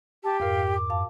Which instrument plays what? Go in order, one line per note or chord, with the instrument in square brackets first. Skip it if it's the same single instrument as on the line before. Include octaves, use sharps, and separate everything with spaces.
[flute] G4 [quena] A5
[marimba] F2 G#2 A#4 [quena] F5
[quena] D6
[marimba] F#2 F5 A5